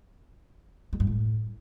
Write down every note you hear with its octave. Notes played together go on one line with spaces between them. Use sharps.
G#3
G2
A2